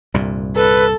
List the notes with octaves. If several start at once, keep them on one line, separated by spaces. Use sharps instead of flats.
C2 G2 A#2
A4 B4